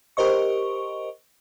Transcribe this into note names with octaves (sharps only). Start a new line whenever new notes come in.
G4 A#4 C5 D#5 C#6